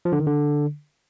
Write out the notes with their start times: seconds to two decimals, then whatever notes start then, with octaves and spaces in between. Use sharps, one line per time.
0.05 F3
0.12 D3
0.20 D#3
0.27 D3